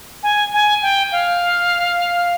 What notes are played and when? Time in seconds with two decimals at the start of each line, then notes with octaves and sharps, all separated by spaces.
0.23 G#5
0.54 G#5
0.82 G5
1.12 F5